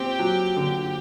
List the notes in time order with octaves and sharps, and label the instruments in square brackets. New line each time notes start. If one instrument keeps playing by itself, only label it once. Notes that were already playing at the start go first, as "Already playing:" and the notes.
Already playing: [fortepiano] C4 [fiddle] G4
[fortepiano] F#3
D3